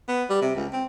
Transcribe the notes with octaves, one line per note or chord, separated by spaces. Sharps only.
B3
G3
C3
C#2
C4